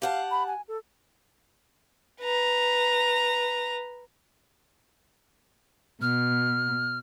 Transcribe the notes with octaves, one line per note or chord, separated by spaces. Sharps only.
G4 F5 F#5 A5
B5
G#5
A4
B4 A#5
B2 F6